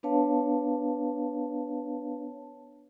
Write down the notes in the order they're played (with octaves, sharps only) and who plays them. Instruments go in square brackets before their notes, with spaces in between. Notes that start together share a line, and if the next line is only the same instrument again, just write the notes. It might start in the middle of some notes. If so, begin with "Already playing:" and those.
[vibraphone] B3 D4 B4 C#5 F5 A5